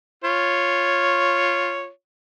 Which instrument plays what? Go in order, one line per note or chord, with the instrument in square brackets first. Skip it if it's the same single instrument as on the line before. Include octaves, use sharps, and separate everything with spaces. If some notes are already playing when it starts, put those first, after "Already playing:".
[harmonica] F4 C#5